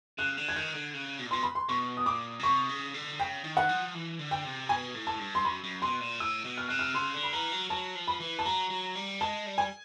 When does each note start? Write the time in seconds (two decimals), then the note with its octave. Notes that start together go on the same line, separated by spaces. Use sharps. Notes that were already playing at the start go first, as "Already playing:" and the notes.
0.18 C#3 F#6
0.37 D3
0.49 G#6
0.56 D#3 G6
0.75 D3
0.94 C#3
1.19 B2
1.26 A#2
1.31 B2 C6
1.43 B5
1.55 C6
1.69 B2 C#6
1.97 D#6
2.06 A#2 D6
2.39 C#3
2.43 C3 C#6
2.69 C#3
2.94 D3
3.19 C#3 G5
3.44 D#3
3.57 F#5
3.69 F3
3.95 E3
4.19 D3
4.31 G5
4.45 C3
4.69 B2 G#5
4.95 A2
5.07 A5
5.19 G2
5.35 C6
5.45 F#2 B5
5.64 F#2
5.82 B2 C6
6.00 A#2
6.20 A2 E6
6.45 B2
6.58 F6
6.68 C3 F#6
6.79 F6
6.95 C#3 C6
7.14 D3
7.23 B5
7.33 E3 A#5
7.52 F#3
7.70 F#3 A5
7.95 F3
8.08 B5
8.20 E3
8.39 A5
8.45 F#3 A#5
8.70 F#3
8.96 G3
9.20 G#3 A5
9.46 G3
9.58 G#5